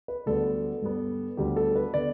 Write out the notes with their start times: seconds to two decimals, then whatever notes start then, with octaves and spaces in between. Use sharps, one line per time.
0.08 B4
0.26 D2 D3 G3 B3 A4
0.82 G2 G3 B3
1.37 D2 D3 G3 B3 G4
1.56 A4
1.75 B4
1.94 D3 B3 D5